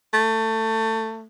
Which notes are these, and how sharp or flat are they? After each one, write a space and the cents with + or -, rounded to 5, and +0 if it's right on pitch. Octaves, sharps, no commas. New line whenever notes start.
A3 +20